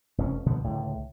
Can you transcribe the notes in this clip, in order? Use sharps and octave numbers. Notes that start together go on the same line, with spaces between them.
F1 F2 C4 C#4
B2 D3 F3 B3
C#2 A2 D3